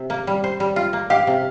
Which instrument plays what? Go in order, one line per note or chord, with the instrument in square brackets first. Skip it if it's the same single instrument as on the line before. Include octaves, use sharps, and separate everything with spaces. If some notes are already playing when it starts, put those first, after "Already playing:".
Already playing: [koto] C3
A#3
G3
C5
G3
F4
A#3
[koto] G4 [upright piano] F5
[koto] C3